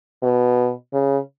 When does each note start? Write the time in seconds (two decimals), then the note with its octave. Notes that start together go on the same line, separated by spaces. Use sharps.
0.23 B2
0.93 C#3